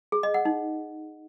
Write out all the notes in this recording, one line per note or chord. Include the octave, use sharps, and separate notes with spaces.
G#4
D#5
F#5
D#4